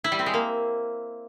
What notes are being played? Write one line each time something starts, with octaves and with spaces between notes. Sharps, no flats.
E4
G3
C4
G#3
A#3